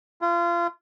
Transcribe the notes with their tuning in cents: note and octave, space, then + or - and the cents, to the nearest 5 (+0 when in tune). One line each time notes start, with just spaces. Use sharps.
F4 -30